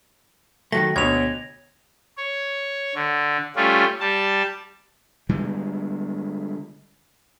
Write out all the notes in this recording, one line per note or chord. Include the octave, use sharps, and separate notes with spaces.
D#3 F#3 A3 A#6
D2 B2 C#5 G#6 F7
C#5
D3
G3 A3 C#4 F4
G3 A5
D3 G3 G#3